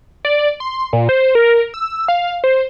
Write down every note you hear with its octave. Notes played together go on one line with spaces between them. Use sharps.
D5
C6
A#2
C5
A#4
E6
F5
C5